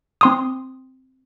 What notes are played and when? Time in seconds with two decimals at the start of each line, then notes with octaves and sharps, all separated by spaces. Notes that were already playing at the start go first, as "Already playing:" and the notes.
0.21 C4 C6 D#6